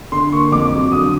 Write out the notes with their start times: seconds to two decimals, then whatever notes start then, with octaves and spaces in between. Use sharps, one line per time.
0.12 D3 C6
0.32 A#3 C#6
0.52 F2 D6
0.72 F#3
0.92 D3 D#6